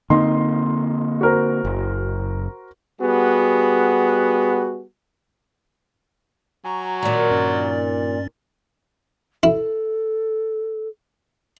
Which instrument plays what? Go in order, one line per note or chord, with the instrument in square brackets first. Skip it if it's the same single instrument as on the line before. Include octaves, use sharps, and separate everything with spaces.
[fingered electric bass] D3 A#3 C4 [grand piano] D#4 C6
[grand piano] F#4 A#4 C5
[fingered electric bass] F#1
[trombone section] G3 B3 F#4 G#4
[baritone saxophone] F#3 [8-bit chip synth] G#5 A#5 C#6
[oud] A#2 D#3 [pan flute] D5
[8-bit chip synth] G2 C#4 A6
[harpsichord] E4 [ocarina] A4